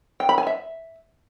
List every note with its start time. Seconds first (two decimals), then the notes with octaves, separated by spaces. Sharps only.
0.20 G5
0.29 B5
0.38 G#5
0.47 E5